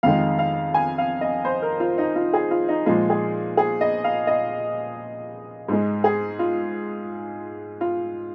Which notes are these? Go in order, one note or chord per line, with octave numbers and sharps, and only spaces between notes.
F2 D#3 G#3 F5
F5
G#5
F5
D#5
C5
A#4
F4
D#4
F4
G#4
F4
D#4
A#2 F3 G#3 F4
G#4
G#4
D#5
F5
D#5
G#2 G#3
G#4
F4
F4